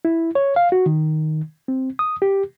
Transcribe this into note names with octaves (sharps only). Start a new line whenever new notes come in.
E4
C#5
F5
F#4
D#3
C4
D#6
G4